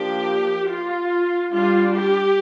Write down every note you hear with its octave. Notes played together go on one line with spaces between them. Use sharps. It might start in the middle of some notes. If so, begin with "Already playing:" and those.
Already playing: F3 A#3 D4 G4
F4
G3 D4 F4
G4